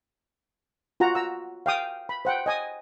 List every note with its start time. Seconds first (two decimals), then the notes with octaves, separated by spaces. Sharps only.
1.00 F4 F#4 F#5 A#5
1.15 A#5 E6
1.66 F5 G5 D#6
2.09 B5
2.25 C5 F#5 G5
2.46 D#5 G#5 D#6